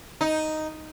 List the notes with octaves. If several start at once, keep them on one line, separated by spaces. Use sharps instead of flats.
D#4